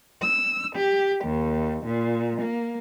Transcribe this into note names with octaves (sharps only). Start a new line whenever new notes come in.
E6
G4
D#2
A#2
A#3